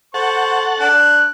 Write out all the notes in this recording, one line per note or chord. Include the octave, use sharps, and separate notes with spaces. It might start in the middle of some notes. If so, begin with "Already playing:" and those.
A4 C5 F#5 C#6
D4 F#6